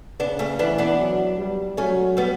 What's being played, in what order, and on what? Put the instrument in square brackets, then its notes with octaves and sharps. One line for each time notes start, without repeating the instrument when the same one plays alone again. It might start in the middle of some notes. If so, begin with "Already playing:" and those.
[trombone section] C#3 [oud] B3 D4
[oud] A3 C#4
[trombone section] E3 [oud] B3 D4
[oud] B3 D4
[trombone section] F#3
G3
[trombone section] F#3 [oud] A3 C#4
[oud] G3 B3